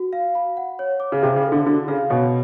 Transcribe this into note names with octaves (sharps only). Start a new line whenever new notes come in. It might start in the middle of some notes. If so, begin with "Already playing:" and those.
Already playing: F#4
F5
B5
F#5
C#5
D6
C#3
C3 C5
C#3
A4
D3
D3 F#4
C#3 F5
B2 C#5